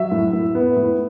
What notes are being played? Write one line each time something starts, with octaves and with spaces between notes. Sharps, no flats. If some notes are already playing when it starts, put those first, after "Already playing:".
Already playing: F#3 E5
A2
A2
B3
A2